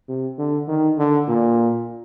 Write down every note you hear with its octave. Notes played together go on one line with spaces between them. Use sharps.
C3
D3
D#3
D3
A#2